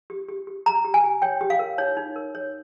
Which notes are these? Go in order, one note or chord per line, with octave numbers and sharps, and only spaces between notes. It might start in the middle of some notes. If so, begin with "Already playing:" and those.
G4
G4
G4
G4 A#5
G4
G#5
G4
C#5 G5
G4
F5
A#4
D#4 C#5
D#4
A#4
C#5